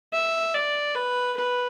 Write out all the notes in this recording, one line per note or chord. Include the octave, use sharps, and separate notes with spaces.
E5
D5
B4
B4